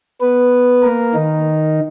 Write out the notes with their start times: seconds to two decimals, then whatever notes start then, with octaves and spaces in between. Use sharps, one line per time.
0.21 B3 B4
0.83 A#3 A#4
1.15 D#3 D#4